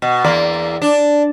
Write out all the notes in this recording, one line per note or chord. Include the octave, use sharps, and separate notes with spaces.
B2
E2 A#3 D5
D4